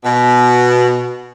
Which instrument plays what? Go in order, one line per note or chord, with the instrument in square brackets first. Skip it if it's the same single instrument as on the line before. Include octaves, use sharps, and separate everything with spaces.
[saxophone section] B2